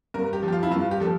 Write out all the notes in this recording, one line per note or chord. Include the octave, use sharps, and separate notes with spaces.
G2 A#4
G4
F3
G4
F4
E4
G2 F4
G4
F3 A4